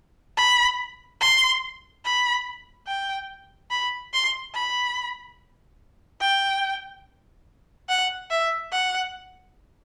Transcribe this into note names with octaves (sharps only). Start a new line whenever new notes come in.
B5
C6
B5
G5
B5
C6
B5
G5
F#5
E5
F#5